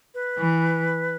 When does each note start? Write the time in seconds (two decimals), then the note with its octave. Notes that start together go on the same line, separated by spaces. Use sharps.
0.14 B4
0.39 E3